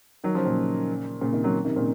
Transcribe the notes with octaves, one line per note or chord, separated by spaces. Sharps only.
D#3 F#3
C#3 F3
A#2 C#3
A#2 C#3
C3 D#3
D#3 F#3
C3 D#3
A#2 C#3